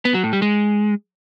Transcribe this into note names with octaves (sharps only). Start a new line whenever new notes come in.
B3
F#3
A2
G3
G#3